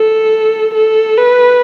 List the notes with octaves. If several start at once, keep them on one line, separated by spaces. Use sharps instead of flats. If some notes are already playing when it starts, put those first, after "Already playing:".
Already playing: A4
A4
B4